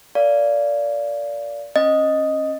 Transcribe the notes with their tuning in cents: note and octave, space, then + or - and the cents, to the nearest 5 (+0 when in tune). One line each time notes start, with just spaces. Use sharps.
A#4 +0 D5 -20 F5 -15
C#4 -35 D#5 +0